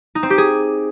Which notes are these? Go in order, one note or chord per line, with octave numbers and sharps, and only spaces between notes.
D#4
C4
G4
G#4